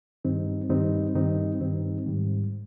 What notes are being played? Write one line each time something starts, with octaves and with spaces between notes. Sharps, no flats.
G2 D#3 G3 C4 D#4
G2 D#3 G3 C4 D#4
G2 D#3 G3 C4 D#4
G2 D#3 G3 C4 D#4
G#2 D#3 G3